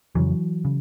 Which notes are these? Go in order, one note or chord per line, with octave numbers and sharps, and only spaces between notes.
F2 C#3 E3 F#3
C#3